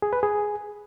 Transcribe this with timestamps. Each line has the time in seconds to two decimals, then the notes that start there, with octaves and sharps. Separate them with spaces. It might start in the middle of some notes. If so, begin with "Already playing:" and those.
0.02 G#4
0.13 B4
0.23 G#4